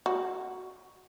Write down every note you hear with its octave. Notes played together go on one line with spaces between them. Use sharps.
F#4